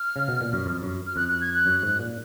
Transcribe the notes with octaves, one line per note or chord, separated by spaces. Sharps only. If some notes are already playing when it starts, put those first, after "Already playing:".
Already playing: F6
C#3
B2
A#2
F#2
F2
F#2
F6
F2 F#6
F#6
G#6
F#6
F#2
G#2
A#2